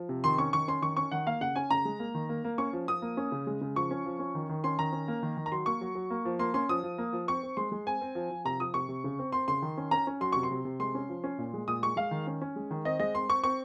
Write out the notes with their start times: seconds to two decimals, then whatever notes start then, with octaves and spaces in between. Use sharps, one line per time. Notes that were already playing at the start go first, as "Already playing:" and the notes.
Already playing: F3
0.09 C3
0.24 D#3 C6
0.38 C#4 C#6
0.53 D#3 C#6
0.68 C#4 C6
0.82 D#3 C#6
0.97 C#4 C#6
1.12 D#3 F#5
1.26 A#3 F5
1.41 C#3 F#5
1.56 C#4 G#5
1.71 C#3 A#5
1.85 G#3
2.00 A#3
2.14 D#3
2.29 A#3
2.44 A#3
2.58 C#4 C#6
2.73 F3
2.88 F3 D#6
3.02 A#3
3.17 C#4
3.32 C#3
3.47 G#3
3.61 C#3
3.76 F3 C#6
3.91 C#4
4.06 F3
4.19 C#4
4.35 D#3
4.49 D#3
4.64 C#4 C6
4.79 D#3 A#5
4.93 C#4
5.08 A#3
5.23 D#3
5.37 D#3
5.46 A#5
5.52 F#3 C6
5.66 A#3 C#6
5.81 F#3
5.95 F#3
6.10 A#3
6.25 F3
6.39 A#3 C6
6.54 C#4 C6
6.69 F3 D#6
6.83 F3
6.98 A#3
7.13 F3
7.28 C4 C#6
7.43 C4
7.57 G#3 C6
7.72 G#3
7.87 C4 G#5
8.01 C4
8.15 F3
8.30 F3
8.45 C3 A#5
8.60 F3 D#6
8.74 C3 C#6
8.89 C3
9.04 C#3
9.19 C4
9.32 C4 C6
9.48 C#3 C6
9.62 D#3
9.77 C#4
9.91 C#4 A#5
10.07 C#4
10.21 F#3 C6
10.32 C3 C#6
10.43 C6
10.51 C3
10.65 C3
10.79 G#3 C6
10.95 C#4
11.09 F3
11.24 C#4
11.38 A#2
11.54 G#3
11.68 A#2 D#6
11.83 G#3 C#6
11.96 G#3 F5
12.11 D#3
12.27 C#4
12.42 C#4
12.56 G#3
12.71 D#3
12.85 C4 D#5
13.00 G#3 D#5
13.15 C4 C6
13.29 C4 C#6
13.44 C4 C#6